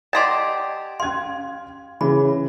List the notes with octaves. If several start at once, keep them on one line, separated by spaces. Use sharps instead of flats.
G4 D5 D#5 F#5 A5 C6
C#4 F5 C6 G#6
C#3 E3 B5